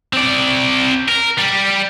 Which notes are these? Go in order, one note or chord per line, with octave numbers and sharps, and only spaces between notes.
C4 D5
A#4
G3